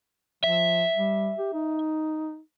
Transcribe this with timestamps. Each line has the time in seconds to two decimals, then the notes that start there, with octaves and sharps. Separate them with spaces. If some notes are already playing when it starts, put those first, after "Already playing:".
0.44 F3 E5
0.96 G3
1.39 G4
1.54 D#4